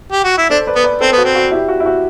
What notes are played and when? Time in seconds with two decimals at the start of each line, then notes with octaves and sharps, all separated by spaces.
0.12 G4
0.24 F#4
0.38 E4
0.50 D4 A4 C5
0.67 B4 D5
0.75 B3
0.84 B4 D5
1.01 C4 A4 C5
1.13 B3
1.18 F#4
1.24 C4
1.35 F#4
1.51 E4 G4
1.68 F#4
1.80 E4
1.86 F#4